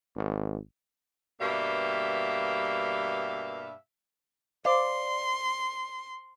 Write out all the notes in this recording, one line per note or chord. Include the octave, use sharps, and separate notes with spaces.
G#1
G2 B2 G3 A#3 E5 F5
C5 D5 F5 C6